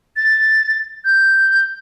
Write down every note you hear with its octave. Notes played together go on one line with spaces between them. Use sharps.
A6
G6